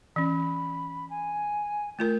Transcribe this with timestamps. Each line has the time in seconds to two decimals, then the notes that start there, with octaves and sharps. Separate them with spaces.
0.16 E3 C#4 B5
1.10 G#5
1.99 A3 F4 A#4 G6